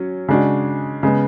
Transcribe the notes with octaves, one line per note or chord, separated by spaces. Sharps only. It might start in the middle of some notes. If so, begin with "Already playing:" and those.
Already playing: F#3 C#4
C#3 G#3 D4 F#4
C#3 G#3 B3